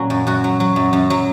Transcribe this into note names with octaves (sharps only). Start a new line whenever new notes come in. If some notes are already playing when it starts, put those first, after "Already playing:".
Already playing: A#2 F#3 A#3 C#4
F#2
F#2 F#4
F#3
F#3
F#2
F#2
F#3